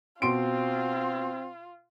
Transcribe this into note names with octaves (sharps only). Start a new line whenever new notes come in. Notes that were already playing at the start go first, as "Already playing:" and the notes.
B2 C4 F4 C6 D7